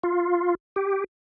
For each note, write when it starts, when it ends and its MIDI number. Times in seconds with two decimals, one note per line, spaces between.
0.03 0.55 65
0.76 1.04 67